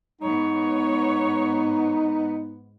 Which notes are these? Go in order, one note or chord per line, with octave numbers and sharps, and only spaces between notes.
G#2 B3 D#4 C#5